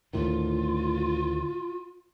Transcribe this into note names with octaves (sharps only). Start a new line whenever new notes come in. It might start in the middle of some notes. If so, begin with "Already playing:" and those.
D2 A2 D#3 F4